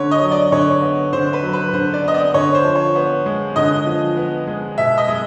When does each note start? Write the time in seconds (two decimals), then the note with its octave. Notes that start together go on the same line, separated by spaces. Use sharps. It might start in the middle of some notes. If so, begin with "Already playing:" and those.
Already playing: D3 C#5
0.11 D#5
0.21 F#3
0.32 D5
0.52 D3 C#5
0.82 B3
1.13 D3 C5
1.33 B4
1.43 F#3
1.53 B4
1.73 D3 C5
1.94 D5
2.04 B3 D#5
2.14 D5
2.34 D3 C#5
2.55 C5
2.64 F3
2.75 C#5
2.96 B3
3.26 G#3
3.56 D3 D#5
3.86 F3
4.17 B3
4.47 G#3
4.78 B2 E5
4.98 D#5
5.08 G#3